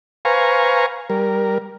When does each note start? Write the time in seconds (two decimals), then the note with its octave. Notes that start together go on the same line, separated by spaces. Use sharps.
0.25 B4 C5 F5 G#5 A#5 C#6
1.10 G3 A#4